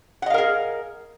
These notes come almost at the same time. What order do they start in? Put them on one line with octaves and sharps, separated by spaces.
F#5 D#5 F5 A#4 G#4